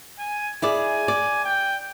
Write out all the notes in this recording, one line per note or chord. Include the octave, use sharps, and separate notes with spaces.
G#5
E4 G#4 D5 G#5
D5
G5